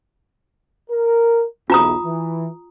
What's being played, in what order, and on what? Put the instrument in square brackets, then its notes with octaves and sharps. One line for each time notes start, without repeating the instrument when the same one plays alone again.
[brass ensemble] A#4
[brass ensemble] B1 E2 [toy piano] F4 A#5 D#6
[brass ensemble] E3